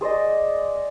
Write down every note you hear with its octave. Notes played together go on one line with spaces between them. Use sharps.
G#4 C5 D5 D#5